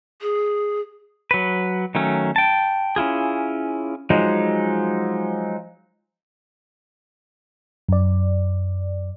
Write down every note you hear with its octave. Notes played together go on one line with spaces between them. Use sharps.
G#4
F#3 B4
D#3 F#3 A3 C#4
G5 A5
C#4 E4 F4 G#4
F3 F#3 G#3 D#4
F#2 D5